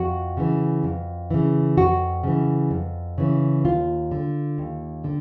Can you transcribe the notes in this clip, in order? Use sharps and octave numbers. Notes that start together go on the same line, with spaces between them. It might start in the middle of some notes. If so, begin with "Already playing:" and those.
Already playing: F2 F#4
C#3 E3
F2
C#3 E3
F2 F#4
C#3 E3
F2
C#3 E3
D#2 F4
D3
D#2
D3